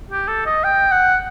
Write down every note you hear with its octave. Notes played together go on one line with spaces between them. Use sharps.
G4
A4
D#5
G5
F#5